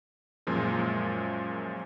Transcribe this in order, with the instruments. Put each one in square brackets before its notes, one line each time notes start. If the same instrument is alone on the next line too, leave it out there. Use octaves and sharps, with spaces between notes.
[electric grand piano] F#2 A#2 F3 G#3 F4